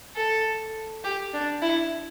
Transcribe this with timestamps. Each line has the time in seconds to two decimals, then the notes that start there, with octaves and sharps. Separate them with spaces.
0.16 A4
1.04 G4
1.34 D4
1.62 E4